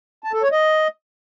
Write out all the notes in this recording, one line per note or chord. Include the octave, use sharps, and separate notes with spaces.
A5
A4
C#5
D#5